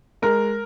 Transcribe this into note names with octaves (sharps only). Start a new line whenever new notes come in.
G#3 A#4